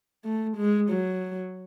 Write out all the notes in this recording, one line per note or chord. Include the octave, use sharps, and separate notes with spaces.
A3
G#3
F#3